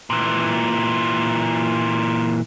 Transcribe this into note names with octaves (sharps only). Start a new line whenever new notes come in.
A#2 E3